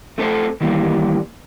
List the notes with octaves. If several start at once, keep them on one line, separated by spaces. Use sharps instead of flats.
A3 C4 A4 B4 C5
D#3 E3 G3 A#3